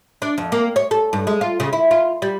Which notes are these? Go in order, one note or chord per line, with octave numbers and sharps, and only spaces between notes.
D4
F2
A#3
C#5
A4
G2
G#3
F4
C#3
E4
F4
G3